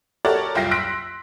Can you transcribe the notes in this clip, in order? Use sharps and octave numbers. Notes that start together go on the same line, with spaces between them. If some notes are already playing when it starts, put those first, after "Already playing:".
F#4 G4 A4 A#4 C#5 D5
F#1 C2 F4 G5 A#6 C7
C6 E6 F#6 A#6 B6 D7